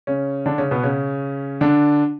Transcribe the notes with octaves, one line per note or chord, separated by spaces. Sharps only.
C#3 C#4
D3 D4
C#3 C#4
B2 B3
C#3 C#4
D3 D4